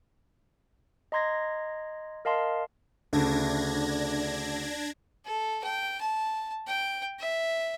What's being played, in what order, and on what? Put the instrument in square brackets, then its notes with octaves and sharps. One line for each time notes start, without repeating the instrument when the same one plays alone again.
[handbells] D#5 A#5 C6 G#6 A#6
A#4 D#5 F5 A5 C6
[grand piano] D2 C#3 A3 [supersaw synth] D4 G#6 A#6
[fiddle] A4
G5
A5
G5
E5